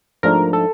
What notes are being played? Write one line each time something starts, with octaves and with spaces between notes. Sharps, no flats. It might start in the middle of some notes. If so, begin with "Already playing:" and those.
G#2 F3 A3 D4 A#4
A4